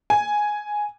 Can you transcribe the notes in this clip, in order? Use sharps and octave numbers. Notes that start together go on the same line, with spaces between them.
G#5